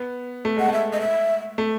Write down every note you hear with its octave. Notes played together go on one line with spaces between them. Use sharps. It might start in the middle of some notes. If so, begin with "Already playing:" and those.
Already playing: B3
A3
G#3 F#5
A3 E5
D#5
E5
A3